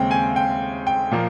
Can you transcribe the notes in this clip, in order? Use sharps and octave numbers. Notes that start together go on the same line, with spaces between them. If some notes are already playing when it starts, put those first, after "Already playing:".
Already playing: D#2 C#3 G#3 C4 G5
G#5
G5
G5
A#2 F3 A#3